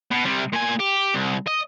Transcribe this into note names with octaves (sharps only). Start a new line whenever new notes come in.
B2
C3 G3
A#2 G#5
G4
C2
D#5